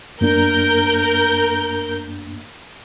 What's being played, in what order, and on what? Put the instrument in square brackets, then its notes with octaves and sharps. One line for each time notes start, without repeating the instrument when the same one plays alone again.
[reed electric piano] F#2 A#3 D4 [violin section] A#4 G6